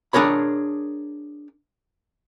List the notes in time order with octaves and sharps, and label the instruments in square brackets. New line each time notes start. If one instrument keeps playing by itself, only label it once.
[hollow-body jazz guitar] D4 G#4 A#4 C#5 B5